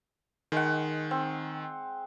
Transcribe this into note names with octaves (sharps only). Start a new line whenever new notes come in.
D#3 G#3 F#5
C4